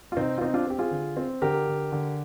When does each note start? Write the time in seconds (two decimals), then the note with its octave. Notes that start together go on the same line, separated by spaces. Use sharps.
0.12 F4
0.17 C3 C4 D#4
0.38 F4
0.41 C4 D#4
0.54 D4 F4
0.67 C4 G4
0.79 F4 G#4
0.91 D3
1.17 C4
1.42 D3 G4 A#4
1.67 D3
1.92 D3